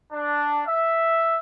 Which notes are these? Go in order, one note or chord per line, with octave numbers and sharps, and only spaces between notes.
D4
E5